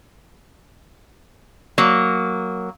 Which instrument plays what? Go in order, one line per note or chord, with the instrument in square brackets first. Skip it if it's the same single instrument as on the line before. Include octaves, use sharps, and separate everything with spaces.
[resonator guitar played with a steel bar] F#3 A#3